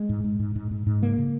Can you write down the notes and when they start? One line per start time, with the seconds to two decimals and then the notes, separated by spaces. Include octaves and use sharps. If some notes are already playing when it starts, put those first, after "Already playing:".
Already playing: G#3
0.09 G#2
0.24 G#2
0.40 G#2
0.56 G#2
0.71 G#2
0.87 G#2
1.02 C#3 A#3
1.18 C#3